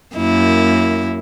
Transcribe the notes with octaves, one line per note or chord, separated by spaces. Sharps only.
F#2 A#3 E4